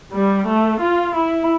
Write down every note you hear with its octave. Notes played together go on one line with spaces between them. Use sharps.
G3
A3
F4
E4